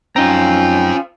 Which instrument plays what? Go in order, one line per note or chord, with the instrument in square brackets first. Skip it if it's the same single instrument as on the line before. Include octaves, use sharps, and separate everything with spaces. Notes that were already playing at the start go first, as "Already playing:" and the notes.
[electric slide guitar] F#2 D#4 A#5 [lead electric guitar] C4 F4 [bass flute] C#4 [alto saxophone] G5